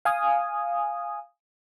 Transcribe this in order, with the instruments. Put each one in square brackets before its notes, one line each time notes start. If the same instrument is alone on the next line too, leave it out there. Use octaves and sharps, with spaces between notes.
[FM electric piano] F5 G#5 D#6